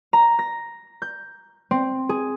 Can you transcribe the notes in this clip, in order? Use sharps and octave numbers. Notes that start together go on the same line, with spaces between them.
A#5
A#6
G6
C4
G#4